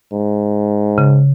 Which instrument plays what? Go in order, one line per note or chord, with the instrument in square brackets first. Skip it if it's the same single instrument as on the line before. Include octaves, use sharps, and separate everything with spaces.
[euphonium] G#2
[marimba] C#3